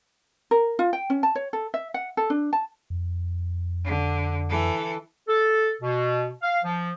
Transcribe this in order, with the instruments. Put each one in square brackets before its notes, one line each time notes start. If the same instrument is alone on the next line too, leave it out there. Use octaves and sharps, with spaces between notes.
[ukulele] A#4
F4
G5
C#4
A5
C#5
A4
E5
F#5
A4
D4
A5
[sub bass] F2
[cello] D3
E3 A4
[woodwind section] A4
B2
F5
F3